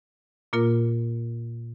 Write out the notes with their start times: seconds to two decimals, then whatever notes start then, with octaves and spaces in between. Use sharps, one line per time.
0.53 A#2 A#3 F4 A#4